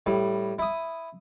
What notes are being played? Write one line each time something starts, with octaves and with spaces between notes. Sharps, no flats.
A2 G3
E4 D#6